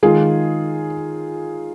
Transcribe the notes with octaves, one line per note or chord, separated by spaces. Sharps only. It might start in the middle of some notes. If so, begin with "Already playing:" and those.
D#3 G#3 F4 G#4